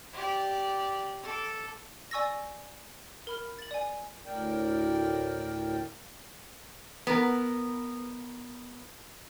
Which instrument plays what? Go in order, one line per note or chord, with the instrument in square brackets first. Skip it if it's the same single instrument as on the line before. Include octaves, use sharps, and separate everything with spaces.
[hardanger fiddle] G4 D5
A4 D6
[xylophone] D5 G#5 C#6 E6 A6 A#6
A#4 B5 F6
A6 F#7
D5 G#5
[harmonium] D2 A2 A#4 D5 G5
[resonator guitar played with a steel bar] B3 A#4